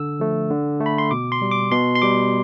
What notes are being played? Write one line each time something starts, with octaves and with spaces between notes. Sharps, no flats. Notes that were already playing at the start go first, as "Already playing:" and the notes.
Already playing: D3 E6
F3 A3
D3
A3
B5
C6
B2 D6
C6
G3
D6
B2 C6
C6
G3 D6